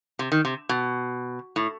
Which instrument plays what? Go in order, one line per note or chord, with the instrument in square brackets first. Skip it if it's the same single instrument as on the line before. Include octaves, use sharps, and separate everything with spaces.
[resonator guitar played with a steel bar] C3
D#3
C3
B2
A2